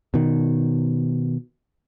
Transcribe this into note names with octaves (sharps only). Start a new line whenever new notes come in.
B2 D#3